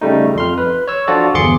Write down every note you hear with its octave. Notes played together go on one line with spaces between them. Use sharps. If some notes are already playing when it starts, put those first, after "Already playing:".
C#3 G3 A3 D#4
F2 C6 F6
B4
C#5 E6
F3 D4 F4 F#4 A4 D5
G1 E2 G#4 C6 D6 C#7